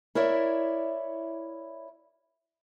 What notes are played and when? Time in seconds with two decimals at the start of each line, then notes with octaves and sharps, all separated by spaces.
0.15 E4 A#4 C#5 D5 E5